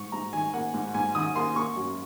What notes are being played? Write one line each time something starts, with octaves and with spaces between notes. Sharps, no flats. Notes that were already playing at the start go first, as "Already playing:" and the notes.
Already playing: G#2 C#6
G#2 A#5
D#3 G#5
A#3 F#5
G#2
G#2 G#5
D#3 D#6
A#3 C6
A#3 C#6
F#2